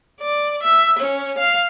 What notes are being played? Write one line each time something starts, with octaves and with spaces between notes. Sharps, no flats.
D5
E5
C#4
F5